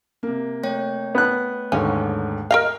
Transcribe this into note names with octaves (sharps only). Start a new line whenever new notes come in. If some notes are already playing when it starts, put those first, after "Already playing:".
C3 A#3
A3 C#5 G5
B3 F#6
D#2 G#2 D3 C#4
A#4 D#5 F5